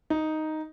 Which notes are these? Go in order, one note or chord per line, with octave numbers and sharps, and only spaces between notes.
D#4